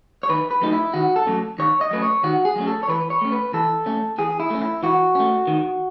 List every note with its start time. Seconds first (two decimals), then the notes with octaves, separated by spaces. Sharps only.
0.23 C#5
0.29 D#3 B4
0.51 B4
0.62 F#3 A3 C#4 D#4
0.73 E4
0.93 D#3 F#4
1.16 A4
1.26 F#3 A3 C#4
1.59 D#3 C#5
1.81 D#5
1.91 F#3 A3 C#4 B4
2.02 C#5
2.23 D#3 F#4
2.45 G#4
2.56 F#3 A3 C#4
2.67 A4
2.83 C#5
2.88 E3 B4
3.10 C#5
3.21 A3 C#4
3.32 B4
3.53 E3 A4
3.86 A3 C#4
4.18 E3 G#4
4.40 E4
4.50 A3 C#4
4.62 E4
4.83 E3 F#4
5.15 A3 C#4
5.47 D#3